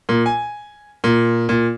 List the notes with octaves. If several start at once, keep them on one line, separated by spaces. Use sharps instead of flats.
A#2
G#5
A#2
A#2